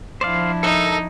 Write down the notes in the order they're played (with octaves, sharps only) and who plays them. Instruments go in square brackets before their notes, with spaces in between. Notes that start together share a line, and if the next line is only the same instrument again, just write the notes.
[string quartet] F3 D4 E4 [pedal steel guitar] C5 D5 F5
[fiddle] D#4 [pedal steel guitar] A4 A#4 E5